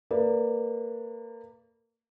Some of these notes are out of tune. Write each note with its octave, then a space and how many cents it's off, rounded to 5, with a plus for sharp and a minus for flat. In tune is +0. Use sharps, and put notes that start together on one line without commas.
A#3 -30 B4 -20 D5 +0